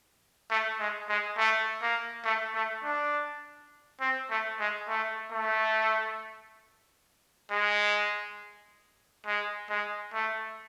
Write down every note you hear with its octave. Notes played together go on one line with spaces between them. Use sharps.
A3
G#3
G#3
A3
A#3
A3
A3
D4
C4
A3
G#3
A3
A3
G#3
G#3
G#3
A3